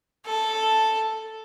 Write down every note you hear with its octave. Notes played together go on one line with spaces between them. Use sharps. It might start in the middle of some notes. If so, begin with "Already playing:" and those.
A4